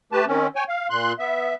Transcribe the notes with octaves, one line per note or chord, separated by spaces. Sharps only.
A3 G4 B4 A5
D#3 C4 C#4
C#5 G5 G#5
F5
A#2 C6 F#6
B3 E5